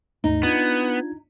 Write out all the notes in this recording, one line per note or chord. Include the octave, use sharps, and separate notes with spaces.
D#2 G#2 A3 D#4
B3 D4 F4 G#6